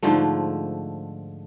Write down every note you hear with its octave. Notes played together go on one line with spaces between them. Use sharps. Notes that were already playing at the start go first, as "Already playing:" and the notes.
G#2 D3 F3 A3